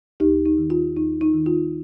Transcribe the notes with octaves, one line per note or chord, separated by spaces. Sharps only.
D#2 D#4 G4
D#4
D#3
F4
D#2 D#4
D#4
D#3
F4